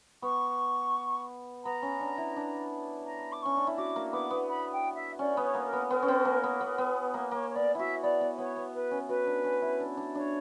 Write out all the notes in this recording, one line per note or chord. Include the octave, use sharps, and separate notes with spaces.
B3 C#6
B3 A#5
C#4
D4
E4
D4
A#5
D6
C#4 C#6
D4
E4
F#4 D6
A#3
B3 D6
B3
B5
G5
E5
C#4 D5
B3
C#5
A#3
A#4
B3
B3 A#4
C#4
B3
A#3
B3
B3
B3
A#3
A#3 C#5
C#5
B3 D5
E4 F#4 E5
B3 D5
B3
B3 C#5
B3
B4
C#4
F#4 B4
D4
C#4
E4
D4
D4
D4 C#5